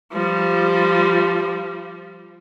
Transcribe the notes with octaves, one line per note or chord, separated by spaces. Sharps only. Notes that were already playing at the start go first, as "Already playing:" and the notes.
F3 G3